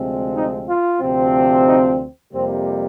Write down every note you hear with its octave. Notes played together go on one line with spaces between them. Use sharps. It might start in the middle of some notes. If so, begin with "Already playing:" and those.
Already playing: D2 C3 F3 G#3 C4
D#4
F4
D2 C3 F3 C4
D#4
F2 C3 G3 A#3 C4